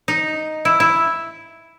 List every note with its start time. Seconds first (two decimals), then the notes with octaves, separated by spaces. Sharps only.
0.08 D#4
0.65 E4
0.80 E4